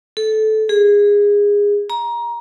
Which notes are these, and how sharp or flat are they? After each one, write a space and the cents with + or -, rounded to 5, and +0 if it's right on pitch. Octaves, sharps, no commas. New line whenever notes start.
A4 -15
G#4 -20
A#5 +20